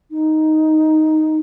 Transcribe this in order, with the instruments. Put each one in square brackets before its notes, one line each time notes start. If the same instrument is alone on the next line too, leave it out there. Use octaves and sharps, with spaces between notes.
[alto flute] D#4